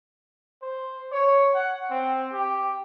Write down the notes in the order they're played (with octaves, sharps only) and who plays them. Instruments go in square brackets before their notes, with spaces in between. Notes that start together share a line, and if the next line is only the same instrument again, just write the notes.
[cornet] C5
C#5
F#5
C4
G4